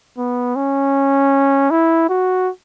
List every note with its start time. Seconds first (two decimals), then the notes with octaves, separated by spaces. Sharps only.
0.18 B3
0.56 C#4
1.71 E4
2.09 F#4